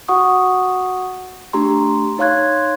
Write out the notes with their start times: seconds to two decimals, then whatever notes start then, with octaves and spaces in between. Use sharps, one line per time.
0.08 F#4 F#5 C#6 D#6
1.53 A3 D4 G4 A#5 C6
2.18 D#4 C#5 F5 C6 F#6 G#6